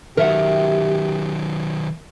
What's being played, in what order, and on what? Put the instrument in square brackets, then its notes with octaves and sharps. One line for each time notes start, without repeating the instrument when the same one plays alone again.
[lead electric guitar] D#3 F#3 [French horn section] G4 [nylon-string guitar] A#4 E5 F#5